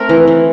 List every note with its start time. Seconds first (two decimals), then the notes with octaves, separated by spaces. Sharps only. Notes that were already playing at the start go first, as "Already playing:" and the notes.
Already playing: A3 C4 A#4
0.09 E3
0.27 E3